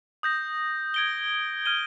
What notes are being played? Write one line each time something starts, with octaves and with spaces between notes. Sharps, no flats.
D#6 G6 A#6
G#6 D7 G7
F6 G#6 D#7 G7